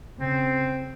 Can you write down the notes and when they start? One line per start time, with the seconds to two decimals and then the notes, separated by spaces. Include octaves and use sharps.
0.20 C#3 C4